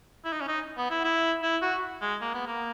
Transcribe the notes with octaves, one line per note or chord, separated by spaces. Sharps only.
E4
D#4
C#4
D#4
B3
E4
E4
E4
F#4
G#3
A#3
B3
A#3